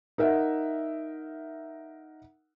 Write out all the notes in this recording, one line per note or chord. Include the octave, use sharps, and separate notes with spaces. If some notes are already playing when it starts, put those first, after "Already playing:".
D#4 A#4 E5 F#5